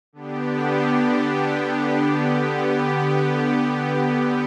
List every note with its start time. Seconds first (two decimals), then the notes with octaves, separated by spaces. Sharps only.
0.13 D3 B3 D4 G4
2.19 D3 B3 G4